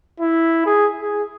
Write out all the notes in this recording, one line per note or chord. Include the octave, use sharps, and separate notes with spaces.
E4
G#4
G#4